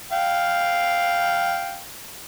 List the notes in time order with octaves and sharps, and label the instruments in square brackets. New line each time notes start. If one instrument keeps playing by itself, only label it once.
[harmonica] F5 G5